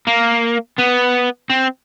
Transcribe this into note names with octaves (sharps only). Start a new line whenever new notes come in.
A#3
B3
C4